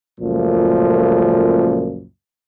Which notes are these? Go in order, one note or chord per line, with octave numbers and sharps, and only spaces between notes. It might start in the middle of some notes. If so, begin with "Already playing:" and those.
C#2 F#2 A#2 F3 A3